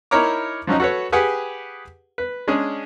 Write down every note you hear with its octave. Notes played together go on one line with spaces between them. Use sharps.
D#4 E4 A#4 C#5 A#5 D6
F3 F#3 C#4 D#4
F#4 A4 B4 C#5
G4 G#4 B4 F#5 G#5
B4
G#3 C#4 D4 G#4